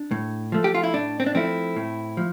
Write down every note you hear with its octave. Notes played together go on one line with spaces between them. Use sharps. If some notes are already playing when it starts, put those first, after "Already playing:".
Already playing: D4
A2
F3 A3
G4
F4
E4
A2 D4
C4
D4
F3 A3 C4 E4
A2
F3